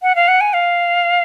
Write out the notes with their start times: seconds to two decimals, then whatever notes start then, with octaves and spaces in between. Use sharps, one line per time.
0.03 F#5
0.16 F5
0.28 F#5
0.41 G#5
0.53 F5